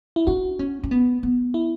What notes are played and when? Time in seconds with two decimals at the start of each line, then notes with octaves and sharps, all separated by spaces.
0.16 E4
0.27 D4 F#4
0.59 C#4
0.83 C#4
0.91 B3
1.23 B3
1.54 E4